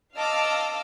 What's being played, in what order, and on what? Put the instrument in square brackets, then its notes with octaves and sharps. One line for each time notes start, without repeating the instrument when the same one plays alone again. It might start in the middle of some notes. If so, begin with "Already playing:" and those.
[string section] D#5 F5 A5 D6 E6 F6